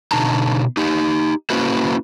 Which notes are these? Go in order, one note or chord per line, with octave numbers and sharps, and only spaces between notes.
B2 D3 D#4 A5 A#5
D#4 G4
A#3 C#4 E4 F#4 B4 C5